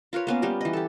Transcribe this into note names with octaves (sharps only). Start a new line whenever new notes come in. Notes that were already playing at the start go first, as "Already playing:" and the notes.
F4 A#4 B4 C#5
A#3 B3 C#4
G3 B3 G4 A#4
E3 D#5
G4 A4